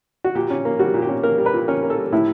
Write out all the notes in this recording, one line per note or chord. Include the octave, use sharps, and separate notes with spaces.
F#4
A#2 G4
C#4
A#3
G3 F#4
A#2
G4
C#4
A#3 A#4
G3
B4
A#2
C#4 A#4
A#3
A4
G3
A2 E4